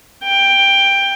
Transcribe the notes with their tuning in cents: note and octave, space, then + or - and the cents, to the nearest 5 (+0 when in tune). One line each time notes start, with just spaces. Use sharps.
G5 +10